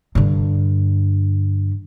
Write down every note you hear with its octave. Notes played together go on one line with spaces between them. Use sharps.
G2 D3